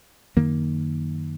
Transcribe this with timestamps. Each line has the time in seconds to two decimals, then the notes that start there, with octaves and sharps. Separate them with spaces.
0.36 F#2 D#3 A#3